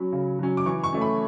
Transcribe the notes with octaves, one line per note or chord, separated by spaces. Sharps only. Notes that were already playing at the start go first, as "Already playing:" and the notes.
Already playing: F#3 C#4 B5
C#3
F#3 C#4
D6
E3 C#6
C#6
A3 C#4
B5